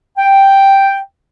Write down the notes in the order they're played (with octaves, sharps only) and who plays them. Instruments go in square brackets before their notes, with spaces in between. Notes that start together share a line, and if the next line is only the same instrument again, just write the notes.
[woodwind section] G5